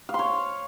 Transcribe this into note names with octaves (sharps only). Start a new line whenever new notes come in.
F5
C6
C#5